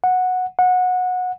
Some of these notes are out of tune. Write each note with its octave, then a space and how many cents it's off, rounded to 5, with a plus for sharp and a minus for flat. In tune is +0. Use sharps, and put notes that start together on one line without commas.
F#5 -10
F#5 -20